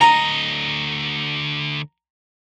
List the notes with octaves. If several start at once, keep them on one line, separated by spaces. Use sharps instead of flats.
D2 D#5 A#5